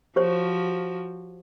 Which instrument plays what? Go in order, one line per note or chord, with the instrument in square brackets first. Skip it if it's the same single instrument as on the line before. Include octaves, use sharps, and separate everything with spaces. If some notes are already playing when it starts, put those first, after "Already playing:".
[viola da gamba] F3 F#4 [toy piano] G4 C5 C#5